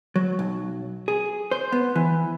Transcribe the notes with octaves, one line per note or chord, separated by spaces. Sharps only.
F#3
B1
G#4
C5
B3
E3